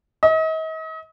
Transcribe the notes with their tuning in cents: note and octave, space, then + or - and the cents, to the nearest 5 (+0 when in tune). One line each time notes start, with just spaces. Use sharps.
D#5 +40